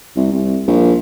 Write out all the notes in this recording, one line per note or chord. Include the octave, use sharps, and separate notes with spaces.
C2
C2
A#1